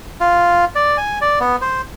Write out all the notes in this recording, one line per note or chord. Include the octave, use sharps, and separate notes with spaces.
F4
D5
G#5
D5
B3
C5